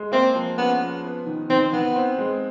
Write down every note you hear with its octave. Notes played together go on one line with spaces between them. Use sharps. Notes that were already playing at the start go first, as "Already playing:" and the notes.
Already playing: G#3
A#3 C4
F3
B3 C#4
F3
B3
D#3
D#3 C4
D#3 B3
C4
G#3